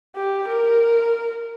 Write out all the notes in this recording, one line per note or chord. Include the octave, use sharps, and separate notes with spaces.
G4
A#4